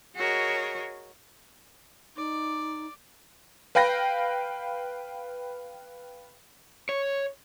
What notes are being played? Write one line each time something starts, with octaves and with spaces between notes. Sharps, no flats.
F#4 G#4 A#4 C#5 D#5
D#4 D5
B4 F5 G5 B5 A#6
C#5